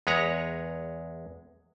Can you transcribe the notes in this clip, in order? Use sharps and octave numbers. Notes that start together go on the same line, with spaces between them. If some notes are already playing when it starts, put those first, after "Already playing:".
E2 G#3 B4 C#5 A#5